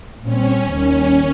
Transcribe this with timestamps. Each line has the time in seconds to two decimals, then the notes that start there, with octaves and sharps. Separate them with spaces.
0.24 A#2 G3 C4 C#4
0.71 D#2 D#3 G3 C#4